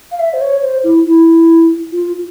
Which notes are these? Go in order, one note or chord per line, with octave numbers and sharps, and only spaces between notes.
F5
E5
C5
C#5
C5
E4
E4
F4